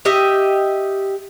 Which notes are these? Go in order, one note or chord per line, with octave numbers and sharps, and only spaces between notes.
G4 D#5 E5